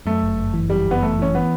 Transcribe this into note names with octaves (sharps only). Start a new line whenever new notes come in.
F#2 A3
G1
G1
E3
F#2 G3
G1 B3
G1 A3
E3 C#4
E3 B3